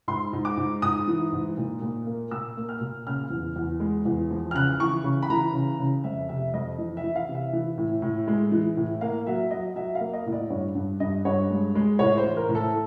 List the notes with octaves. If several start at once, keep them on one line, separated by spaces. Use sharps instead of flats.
G#2 C6
G#2
D6
G#2
G#2 D#6
E3
G#2
A#2
A#2
A#3
A#2 E6
A#3
F6
A#2
C#3 F6
E2
E2
G#3
E2
F3
F6
C#3 F#6
E3 C#6
C#3
B5
E3 A#5
C#3
C#3
F2 E5
C3 E5
F2 D#5
E3
E5
E3
F5
C3
E5
E3
A2
A2
G#3
E3
A2
A#3 F5
F#3 E5
F#3 D#5
F#3 E5
F5
A#3
D#5
A2
D5
G2 C#5
G2
G2 D#5
G2 C#5
G#3
G#3
A2 C#5
C5
E3
A#4
A2
A4